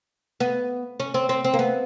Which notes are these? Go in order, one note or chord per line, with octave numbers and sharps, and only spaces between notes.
B3
C#4
C4
C4
C4
A#3
B3